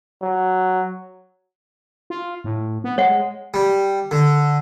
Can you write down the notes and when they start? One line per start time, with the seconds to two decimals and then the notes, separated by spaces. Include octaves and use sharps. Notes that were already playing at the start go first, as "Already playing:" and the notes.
0.22 F#3
2.10 F4
2.44 A2
2.84 B3
2.98 G#3 C#5 F#5
3.54 G3
4.11 D3